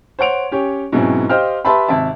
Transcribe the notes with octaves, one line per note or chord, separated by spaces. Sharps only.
C5 C#5 F#5 D7 F7
C#4 G4 C#5
G#2 B2 F#3 C4 C#4 E4
G4 C5 D#5 F5 G5 F6
G4 B4 E5 A5 B5 C6
G#1 C3 E5 A5